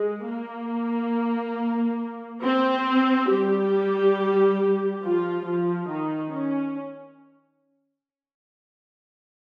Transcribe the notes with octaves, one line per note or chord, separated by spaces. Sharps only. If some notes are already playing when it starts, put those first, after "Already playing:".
Already playing: G#3
A#3
C4
G3 G4
F3 F4
F3 F4
D#3 D#4
C#4